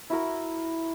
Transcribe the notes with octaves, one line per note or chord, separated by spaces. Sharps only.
E4 F#4 A#4